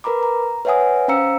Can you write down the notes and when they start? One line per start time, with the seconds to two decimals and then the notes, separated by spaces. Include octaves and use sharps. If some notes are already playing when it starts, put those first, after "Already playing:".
0.04 A#4 B4 A#5 B5 D6
0.23 A#5
0.65 B4 C#5 E5 F#5 G#5 D#6
1.08 C#4 C5 F5 A#5 E6 C#7